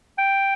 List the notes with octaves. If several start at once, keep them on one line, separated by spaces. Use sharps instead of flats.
G5